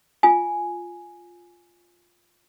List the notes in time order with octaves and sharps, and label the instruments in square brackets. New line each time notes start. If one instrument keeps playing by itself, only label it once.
[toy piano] F4 G#5